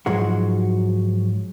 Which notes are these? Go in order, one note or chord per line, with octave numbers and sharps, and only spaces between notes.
G#2 F3 F#3 G#3 F#4